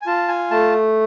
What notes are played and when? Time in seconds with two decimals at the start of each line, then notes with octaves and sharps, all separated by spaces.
0.02 G#5
0.06 F4 A5
0.28 G#5
0.51 A3 A5